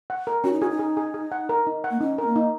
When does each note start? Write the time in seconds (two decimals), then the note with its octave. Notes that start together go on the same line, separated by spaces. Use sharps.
0.10 F#5
0.27 A#4
0.44 C#4 F#4
0.53 D#4
0.61 F#4 G#4
0.70 D#4
0.79 G#4
0.97 G#4
1.14 G#4
1.32 F#5
1.49 A#4
1.67 D#4
1.84 F#5
1.91 A#3
2.00 C#4 D#4
2.18 C#4 A#4
2.27 A#3
2.36 D#4